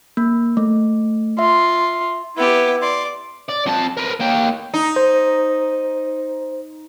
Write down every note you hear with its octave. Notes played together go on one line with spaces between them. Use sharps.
A#3
A3
F4 E5
B3 E4 G4
D5 C6
D5
F2 A5
A#4 B4
A#3 G5
D#4
C5